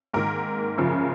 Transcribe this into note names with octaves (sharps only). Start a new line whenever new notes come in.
G#2 D#3 A#3 A#4
F#2 C#3 F3